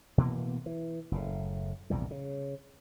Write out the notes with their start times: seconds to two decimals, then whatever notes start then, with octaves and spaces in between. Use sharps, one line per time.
0.18 B2 E3 A#3 B3
0.66 E3
1.12 F#1 A2
1.90 A#1 E2 C3 G3
2.11 C#3